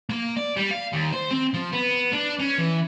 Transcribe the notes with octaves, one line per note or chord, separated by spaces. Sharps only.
A#3
D5
G3
F5
D#2
C5
C4
F3
B3
D4
C#4
E3